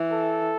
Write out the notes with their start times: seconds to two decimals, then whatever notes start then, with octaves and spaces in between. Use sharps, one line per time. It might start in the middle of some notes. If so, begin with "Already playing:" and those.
Already playing: E3
0.12 A4